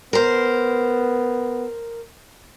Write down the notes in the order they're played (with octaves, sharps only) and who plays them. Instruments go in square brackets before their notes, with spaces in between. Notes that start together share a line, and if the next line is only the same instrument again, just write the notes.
[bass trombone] B3 [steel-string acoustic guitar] A#4 C5